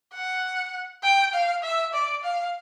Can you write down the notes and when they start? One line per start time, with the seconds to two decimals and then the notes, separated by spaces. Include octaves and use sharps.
0.13 F#5
1.03 G5
1.34 F5
1.63 E5
1.93 D5
2.24 F5